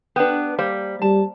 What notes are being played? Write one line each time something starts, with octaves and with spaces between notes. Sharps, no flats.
B3 D4 G4 B4
G3 A#3 C5
G3 A5